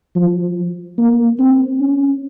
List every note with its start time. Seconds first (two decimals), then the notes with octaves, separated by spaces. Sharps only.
0.16 F3
0.98 A#3
1.39 C4
1.81 C#4